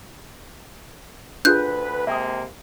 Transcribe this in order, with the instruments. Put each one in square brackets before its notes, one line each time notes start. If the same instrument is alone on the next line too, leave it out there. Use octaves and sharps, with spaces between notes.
[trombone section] D2 B4 [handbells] D4 F4 G#4 [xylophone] F#6 G6
[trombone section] C3 G#3 A#3 [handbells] E5 G5 D#6